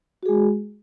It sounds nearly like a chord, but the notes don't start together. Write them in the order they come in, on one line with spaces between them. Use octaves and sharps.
F#4 G#4 G#3